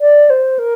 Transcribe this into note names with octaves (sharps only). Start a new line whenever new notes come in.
D5
C5
A#4